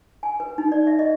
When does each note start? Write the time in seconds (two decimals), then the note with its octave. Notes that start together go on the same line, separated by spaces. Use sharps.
0.23 G#5
0.40 B4
0.58 D#4
0.72 D5
0.87 E5
0.99 D#5